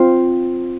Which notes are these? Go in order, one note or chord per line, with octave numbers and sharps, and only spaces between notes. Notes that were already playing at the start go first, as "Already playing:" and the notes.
Already playing: C4 F4